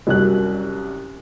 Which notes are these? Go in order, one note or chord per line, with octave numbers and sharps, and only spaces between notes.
C2 F#2 F#6